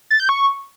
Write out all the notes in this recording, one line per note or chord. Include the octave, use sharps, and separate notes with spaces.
A6
G6
C#6